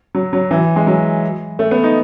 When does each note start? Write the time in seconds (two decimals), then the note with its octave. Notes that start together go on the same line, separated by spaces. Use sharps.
0.15 F#3
0.33 F#3
0.51 E3
0.76 G#3
0.87 F#3
1.59 A3
1.71 B3
1.84 D#4